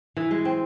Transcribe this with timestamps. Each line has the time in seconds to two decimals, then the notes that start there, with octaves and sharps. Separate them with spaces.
0.16 E3
0.31 G#3
0.45 C4